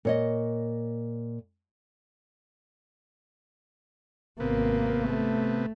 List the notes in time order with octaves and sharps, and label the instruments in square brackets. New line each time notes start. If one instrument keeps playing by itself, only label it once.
[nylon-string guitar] A#2 C#5 D#5
[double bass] G#1 A#3 [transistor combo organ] C3 B3
[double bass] A3